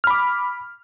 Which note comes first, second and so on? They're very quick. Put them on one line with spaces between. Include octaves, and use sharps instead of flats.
F6 B5 D6